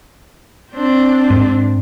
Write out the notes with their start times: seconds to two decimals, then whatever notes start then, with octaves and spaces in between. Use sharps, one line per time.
0.72 C4 D4
1.30 G#2